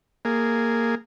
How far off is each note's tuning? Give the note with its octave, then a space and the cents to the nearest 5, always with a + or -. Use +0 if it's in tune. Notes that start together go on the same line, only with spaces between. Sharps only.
A#3 -10 G#4 +0